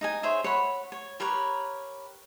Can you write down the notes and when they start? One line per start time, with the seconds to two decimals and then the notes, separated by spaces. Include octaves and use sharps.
0.01 D#4 D#5 G#5
0.23 G#4 C5 C#5 E5
0.44 C#5 F#5 B5
0.92 C#5
1.20 G4 A#4 B4 C#5